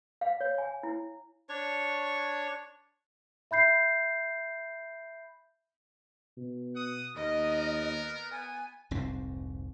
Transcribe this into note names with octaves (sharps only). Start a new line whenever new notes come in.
F5
C#5
G#5
E4
D4 C#5 C#6
E5 B5 G6 C7
B2
F#5 D#6
D#2 B3 A#4 D#5
B3 G#5
F1 C2 G#2 C4